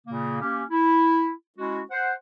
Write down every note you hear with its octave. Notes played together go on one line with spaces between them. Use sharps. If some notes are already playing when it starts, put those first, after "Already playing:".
A#2 C#3 A#3
A#3 C#4 G4
E4
G#3 C#4 E4 F#4
C5 F#5